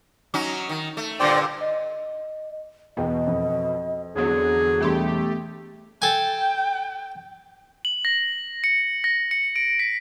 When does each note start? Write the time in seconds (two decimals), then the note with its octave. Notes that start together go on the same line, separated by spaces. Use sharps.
0.34 F#3 C#4 D#4
0.69 D#3
0.97 A3
1.20 G2 A#2 D3 C5 D5 G5
1.61 D#5
2.97 E2 B2 D#5 G5
3.27 F2
4.15 E2 D3 F#3 B3 G#4
4.80 E1 G3 A3 G4 C6
6.02 A4 G5 G#5
7.85 F#7
8.05 A#6
8.64 C#7
9.04 A#6
9.31 C#7
9.56 D7
9.79 B6